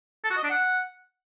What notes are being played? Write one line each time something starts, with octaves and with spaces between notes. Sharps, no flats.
A4
F#4
D#5
D4
F#5